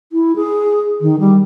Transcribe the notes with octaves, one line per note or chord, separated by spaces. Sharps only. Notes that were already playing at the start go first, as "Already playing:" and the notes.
E4
G#4
D#3
G3